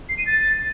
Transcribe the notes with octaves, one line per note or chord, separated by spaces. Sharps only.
C7
D#7
A6